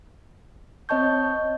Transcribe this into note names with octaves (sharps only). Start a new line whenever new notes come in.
C4 C#5 D#5 A5 C#6 G6